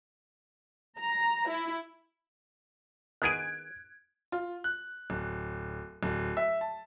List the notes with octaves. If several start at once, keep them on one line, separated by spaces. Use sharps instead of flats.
A#5
E4
D#3 B3 G#4 F#6 G#6 D7
F4
F#6
D1
D1
E5
A5